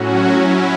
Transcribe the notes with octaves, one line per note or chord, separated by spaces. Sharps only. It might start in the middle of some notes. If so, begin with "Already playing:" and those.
Already playing: A2 F#3 C#4 F#4
F#3 C#4 E4